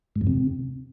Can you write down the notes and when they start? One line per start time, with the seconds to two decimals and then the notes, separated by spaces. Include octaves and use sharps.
0.16 G#2
0.21 F2
0.27 C3